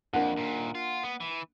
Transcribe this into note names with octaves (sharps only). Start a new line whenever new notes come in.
F2 A#3 D4 F#5
D#2 A#2
F4
B3
E3